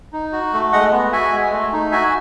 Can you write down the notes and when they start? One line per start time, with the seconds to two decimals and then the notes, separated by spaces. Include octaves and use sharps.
0.13 D#4
0.32 F#4
0.53 A3
0.72 G#3 D#5 F#5
0.92 B3
1.12 F#4 E5 G#5
1.33 G#3
1.52 A3
1.72 D#4
1.92 F#4 E5 G#5